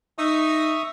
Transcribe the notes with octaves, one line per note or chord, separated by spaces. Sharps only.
D#4 E5 C#6 D#6